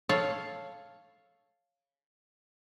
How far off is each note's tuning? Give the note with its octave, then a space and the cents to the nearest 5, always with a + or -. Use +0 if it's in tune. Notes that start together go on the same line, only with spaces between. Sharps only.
A4 +0 C#5 +0 F5 +0